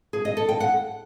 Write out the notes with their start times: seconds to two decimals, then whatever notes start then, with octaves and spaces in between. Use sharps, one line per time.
0.13 G#4
0.25 D#5
0.37 A4
0.49 G5
0.60 F#5